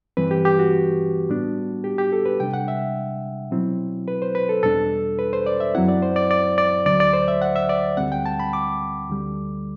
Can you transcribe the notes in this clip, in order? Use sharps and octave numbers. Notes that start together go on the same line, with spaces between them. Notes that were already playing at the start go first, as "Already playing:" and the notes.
G2 E3 G3 C4 B4
G4
G4
F#4
A2 G3 B3 D4
G4
G4
A4
B4
C3 G3 D4 G5
F#5
E5
B2 F#3 C4 E4
B4
C5
B4
A4
E2 B2 G3 D4 A4
B4
C5
D5
E5
F#2 F#3 C4 E4 F#5
D5
C5
D5
D5
D5
D2 D3 F#3 D5
D5
C5
E5
F#5
E5
D5
D2 D3 G3 C4 F#5
G5
A5
B5
D6
D2 D3 G3